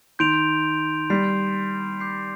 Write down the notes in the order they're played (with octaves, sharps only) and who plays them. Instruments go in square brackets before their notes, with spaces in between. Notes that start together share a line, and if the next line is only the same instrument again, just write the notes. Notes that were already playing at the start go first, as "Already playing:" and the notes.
[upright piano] D#3 [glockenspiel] C6 G6 D7 F7
[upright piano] G3 [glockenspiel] C6 G6 C7
[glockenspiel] D6 G6 C7